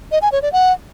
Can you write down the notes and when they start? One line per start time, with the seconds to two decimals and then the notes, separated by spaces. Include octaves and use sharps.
0.12 D#5
0.22 G#5
0.32 C#5
0.42 D5
0.53 F#5